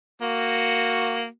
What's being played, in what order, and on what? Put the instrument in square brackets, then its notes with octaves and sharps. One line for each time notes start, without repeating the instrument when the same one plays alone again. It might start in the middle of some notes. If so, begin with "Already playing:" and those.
[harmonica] A#3 F#4